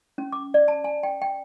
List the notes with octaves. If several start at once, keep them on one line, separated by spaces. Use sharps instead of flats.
C#4
D6
D5
A5
G#5
G5
G5